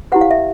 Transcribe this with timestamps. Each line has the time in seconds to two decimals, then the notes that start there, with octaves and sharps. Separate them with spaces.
0.12 E4 G4 B4 F#5
0.21 F5
0.31 E5